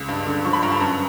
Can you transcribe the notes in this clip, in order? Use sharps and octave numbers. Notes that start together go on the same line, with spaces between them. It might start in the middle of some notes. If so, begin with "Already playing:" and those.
Already playing: C#2
G2
D3
F3 C#6
B5
G2 A#5
A5
F#2 A#5